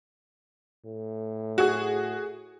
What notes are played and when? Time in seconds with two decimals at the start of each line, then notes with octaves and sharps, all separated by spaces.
0.85 A2
1.58 F#4 G#4